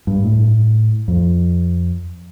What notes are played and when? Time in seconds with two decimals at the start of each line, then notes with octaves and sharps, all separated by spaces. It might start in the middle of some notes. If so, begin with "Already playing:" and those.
0.07 G2
0.24 A2
1.08 F2